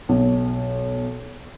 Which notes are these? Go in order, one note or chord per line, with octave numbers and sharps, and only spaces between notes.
B1